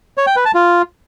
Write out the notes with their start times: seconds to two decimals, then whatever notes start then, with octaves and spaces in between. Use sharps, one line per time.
0.18 C#5
0.27 G5
0.36 B4
0.45 A5
0.55 F4